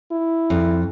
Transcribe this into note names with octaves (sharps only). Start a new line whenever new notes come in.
E4
F2